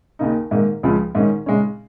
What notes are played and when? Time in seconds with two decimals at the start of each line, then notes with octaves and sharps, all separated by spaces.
0.19 D#2 C#3 A#3 D#4
0.51 G#2 D#3 A#3
0.83 C#2 C#3 F3 G#3
1.15 G#2 D#3 C#4
1.46 C#3 G#3 C#4